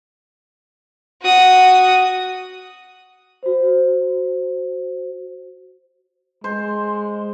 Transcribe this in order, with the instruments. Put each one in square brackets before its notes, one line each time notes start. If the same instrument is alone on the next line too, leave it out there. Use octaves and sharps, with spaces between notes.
[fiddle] F#4 D#6
[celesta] F#4 C5
[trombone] G#3 [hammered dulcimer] C5